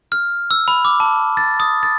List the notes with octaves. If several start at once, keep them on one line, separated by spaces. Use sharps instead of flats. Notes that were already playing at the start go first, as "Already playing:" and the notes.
F6
E6
B5
D6
A5
A6
D#6
A6